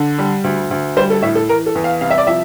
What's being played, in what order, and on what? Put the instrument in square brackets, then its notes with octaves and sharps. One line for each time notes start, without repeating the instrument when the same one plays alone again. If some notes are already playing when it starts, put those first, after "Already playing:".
Already playing: [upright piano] D3
G3
D2
D2
G3 C5
A4
A2 E5
A4
E3 A#4
A4
E2
F5
C2 F5
E5
D5
F3 E5